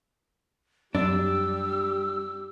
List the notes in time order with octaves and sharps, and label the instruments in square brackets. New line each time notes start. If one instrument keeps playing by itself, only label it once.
[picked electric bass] F#2 [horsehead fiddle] G3 G4 [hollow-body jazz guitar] D4 [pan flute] E6